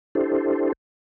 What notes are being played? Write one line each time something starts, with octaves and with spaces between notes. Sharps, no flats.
D4 E4 G4 A4 C5